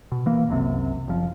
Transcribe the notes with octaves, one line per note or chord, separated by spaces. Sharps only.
B2
E3 A#3
F#1 C2 F#2 C3
F#1 F3